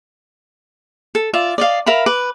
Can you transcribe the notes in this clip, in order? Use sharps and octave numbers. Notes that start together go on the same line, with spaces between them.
A4
F4 D5 E5
D5 D#5 F5
A#4 E5 F5 B5
B4 D6